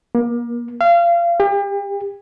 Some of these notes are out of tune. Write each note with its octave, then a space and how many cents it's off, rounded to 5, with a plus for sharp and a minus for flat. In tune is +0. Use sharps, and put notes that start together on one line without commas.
A#3 +30
F5 -30
G4 +40